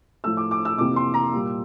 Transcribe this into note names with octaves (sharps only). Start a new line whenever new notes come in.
A2 F3 A3 E6
D6
D6
E6
F2 C3 E3 A#3 D6
C6
A#5
A#2 G3 A#3